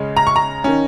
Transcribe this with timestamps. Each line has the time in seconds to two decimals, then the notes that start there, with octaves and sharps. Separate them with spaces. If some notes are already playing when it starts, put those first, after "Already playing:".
Already playing: C#3 G#3 C#4
0.16 A#5
0.27 C#6
0.36 A#5
0.64 D#3 C#4